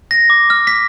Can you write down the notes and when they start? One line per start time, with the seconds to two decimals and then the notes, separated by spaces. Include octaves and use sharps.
0.11 A#6
0.30 D6
0.50 F6
0.67 B6